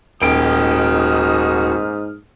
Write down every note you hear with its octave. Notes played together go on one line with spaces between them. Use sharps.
D#1 G#2 D#4 F#4 G5 D#6 F6 D7